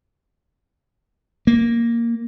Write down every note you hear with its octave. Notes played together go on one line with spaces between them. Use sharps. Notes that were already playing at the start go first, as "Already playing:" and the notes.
A#3